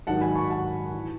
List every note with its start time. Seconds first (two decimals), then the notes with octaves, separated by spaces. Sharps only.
0.07 G#2 D#3 F#3 F#5 A5
0.21 G#5 B5
0.36 A5 C#6
0.50 F#5 A5
0.94 E3